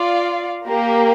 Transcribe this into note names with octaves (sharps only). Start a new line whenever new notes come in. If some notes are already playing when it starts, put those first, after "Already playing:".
Already playing: F4 D5 F5
A#3 G4 A#4